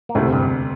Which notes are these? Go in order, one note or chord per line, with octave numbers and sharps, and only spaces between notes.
A#3
E1 D2 A2 C3 A3
G2 G3